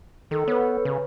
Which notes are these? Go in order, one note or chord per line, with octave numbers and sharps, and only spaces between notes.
D#3 A4
B3 B4 C#5
C#3